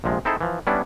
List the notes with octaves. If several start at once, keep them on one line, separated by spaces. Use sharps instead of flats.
A#1 C3 F3 G#3
C4 D#4 E4 G#4 A4 C5
E3 F3
G3 B3 C#4 D4 E4